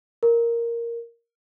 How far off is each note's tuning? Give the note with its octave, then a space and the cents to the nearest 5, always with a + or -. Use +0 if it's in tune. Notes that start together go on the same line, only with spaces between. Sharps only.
A#4 +0